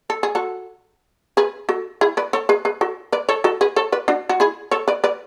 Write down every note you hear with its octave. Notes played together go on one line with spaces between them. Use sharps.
A4
G#4
F#4 A4
G#4 B4
F#4 A4
E4 G#4
B4 D5
A4 C#5
G#4 B4
G#4 B4
F#4 A4
B4 D5
A4 C#5
F#4 A4
G#4 B4
A4 C#5
B4 D5
D4 F#4
F#4
E4 G#4
A4 C#5
B4 D5
B4 D5